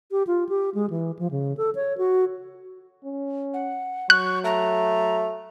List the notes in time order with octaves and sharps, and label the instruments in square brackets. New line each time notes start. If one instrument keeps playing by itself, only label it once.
[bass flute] G4
F4
G4
G#3
E3
F3
C#3
A4
C#5
F#4
[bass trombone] C#4
[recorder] F#5
[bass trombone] F#3 [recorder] C#6 [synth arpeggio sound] F#6
[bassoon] A3 [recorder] A#5